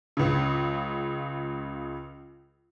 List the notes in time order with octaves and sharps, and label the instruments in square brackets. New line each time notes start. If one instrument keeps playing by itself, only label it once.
[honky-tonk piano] C#2 C#3